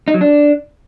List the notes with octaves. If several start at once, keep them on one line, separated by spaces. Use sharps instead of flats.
D#4
F#3
D4